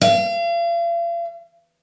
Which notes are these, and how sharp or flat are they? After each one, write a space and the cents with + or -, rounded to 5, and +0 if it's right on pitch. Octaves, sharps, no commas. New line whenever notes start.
F5 -40